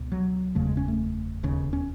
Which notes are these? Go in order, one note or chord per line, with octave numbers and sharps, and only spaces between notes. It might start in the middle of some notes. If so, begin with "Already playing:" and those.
Already playing: C#2 B2
F#3
F#1 E2 C#3 A3
G#3
C#4
A3
E1 D#2 C#3
C#4